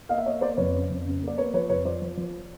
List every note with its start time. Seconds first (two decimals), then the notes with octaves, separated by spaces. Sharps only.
0.09 A#3 D#5 F5
0.18 E5
0.26 A#3 C#5 D#5
0.41 A#3 C5 D5
0.57 F2 B4 C#5
0.74 C#3
0.90 F2
1.05 C#3
1.22 A#3
1.28 D5
1.38 A#3 B4 C#5
1.54 F3 B4 C#5
1.69 F2 B4 C#5
1.85 F3 C5 D5
2.02 F3
2.17 F3